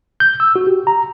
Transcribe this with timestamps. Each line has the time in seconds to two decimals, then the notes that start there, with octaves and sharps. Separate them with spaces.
0.20 G6
0.40 E6
0.56 F#4
0.67 G4
0.87 A#5